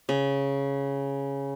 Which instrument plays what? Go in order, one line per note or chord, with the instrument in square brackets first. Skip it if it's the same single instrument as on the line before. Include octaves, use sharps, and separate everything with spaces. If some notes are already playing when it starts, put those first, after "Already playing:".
[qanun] C#3